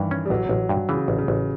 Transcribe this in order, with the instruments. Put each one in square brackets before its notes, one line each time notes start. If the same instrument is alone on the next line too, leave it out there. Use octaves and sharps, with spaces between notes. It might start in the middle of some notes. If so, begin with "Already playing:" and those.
Already playing: [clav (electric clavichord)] G2 [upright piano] D#3 E3
[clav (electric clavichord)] C#4
[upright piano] G3
[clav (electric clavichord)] A1 [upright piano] F#3
[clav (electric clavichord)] A1
G2
[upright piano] C#3 [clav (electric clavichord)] E3
[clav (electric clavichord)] A1
[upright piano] C#3
[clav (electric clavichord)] A1